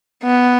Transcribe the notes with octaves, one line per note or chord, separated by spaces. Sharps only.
B3